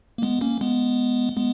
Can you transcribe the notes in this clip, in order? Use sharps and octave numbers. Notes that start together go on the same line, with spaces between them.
A#3
G#3 B3
A#3 C#4
G#3 B3
G#3 B3